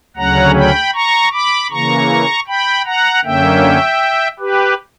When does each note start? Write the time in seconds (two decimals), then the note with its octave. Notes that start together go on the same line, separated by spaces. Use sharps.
0.17 D2 C#3 F#3 C#4 F#5 A#5
0.56 G5 B5
0.94 A#5 C#6
1.32 B5 D6
1.71 C#3 E3 A#3 A#5 C#6
2.47 G5 B5
2.86 F#5 A#5
3.24 F#2 D3 A#3 C#4 E5 G5
4.39 G4 B4